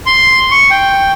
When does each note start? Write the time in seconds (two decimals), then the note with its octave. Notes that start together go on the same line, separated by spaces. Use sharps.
0.06 C6
0.51 C#6
0.71 G5